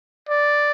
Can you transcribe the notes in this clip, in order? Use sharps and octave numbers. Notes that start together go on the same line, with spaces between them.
D5